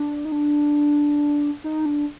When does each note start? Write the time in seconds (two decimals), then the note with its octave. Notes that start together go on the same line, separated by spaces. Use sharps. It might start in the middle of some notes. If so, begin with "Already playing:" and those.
Already playing: D4
0.25 D#4
0.32 D4
1.64 D#4
1.86 D4